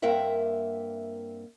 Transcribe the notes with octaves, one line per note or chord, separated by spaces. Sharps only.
G2 A#3 C4 A#4 E5 F#5